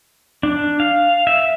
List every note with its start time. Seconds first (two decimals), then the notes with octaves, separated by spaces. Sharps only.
0.43 D4
0.80 F5
1.27 E5